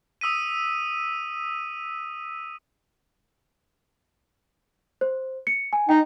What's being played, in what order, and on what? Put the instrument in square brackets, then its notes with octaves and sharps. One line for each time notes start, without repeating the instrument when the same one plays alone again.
[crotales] D#6 E6 B6 D#7
[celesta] C5
C#7
G#5
[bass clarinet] D#4 [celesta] G5